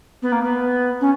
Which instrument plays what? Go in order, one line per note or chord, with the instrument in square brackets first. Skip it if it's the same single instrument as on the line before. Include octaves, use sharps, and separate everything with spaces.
[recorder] B3
A#3
B3
C#4